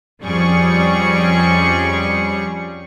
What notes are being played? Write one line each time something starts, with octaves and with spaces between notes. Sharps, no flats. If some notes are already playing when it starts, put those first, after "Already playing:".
F2 F3 G3 C#4 G#4 C#6